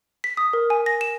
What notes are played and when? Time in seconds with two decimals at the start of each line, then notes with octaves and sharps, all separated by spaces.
0.24 B6
0.37 D#6
0.53 A#4
0.70 G#5
0.86 A#6
1.01 E7